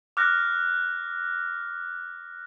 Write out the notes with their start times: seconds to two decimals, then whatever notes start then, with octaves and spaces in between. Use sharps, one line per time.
0.17 D6 F6 F#6 A#6